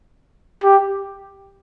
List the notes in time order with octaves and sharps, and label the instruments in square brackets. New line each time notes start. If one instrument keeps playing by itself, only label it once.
[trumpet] G4